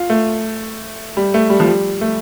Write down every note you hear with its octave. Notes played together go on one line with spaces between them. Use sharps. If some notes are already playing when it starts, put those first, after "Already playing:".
Already playing: F4
A3
G3
A3
G3
F3
G3
A3